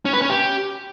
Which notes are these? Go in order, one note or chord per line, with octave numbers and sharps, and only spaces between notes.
C#4
B4
C#4
G4